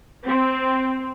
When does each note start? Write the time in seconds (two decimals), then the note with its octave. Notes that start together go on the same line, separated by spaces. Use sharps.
0.25 C4